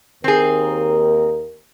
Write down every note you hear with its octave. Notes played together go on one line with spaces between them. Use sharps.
D#2 C4 G#4 A#4